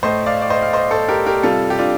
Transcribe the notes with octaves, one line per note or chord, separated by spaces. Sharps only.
A2 A3 C5 D#5
D5 F5
D5
C5 D#5
F5
C5 D#5
A4 C5
G4 A#4
G4 A#4
C3 G3 F4 A4
G4
D4 F4